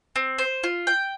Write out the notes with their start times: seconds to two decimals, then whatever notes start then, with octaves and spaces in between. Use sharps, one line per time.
0.16 C4
0.38 C5
0.64 F4
0.87 G5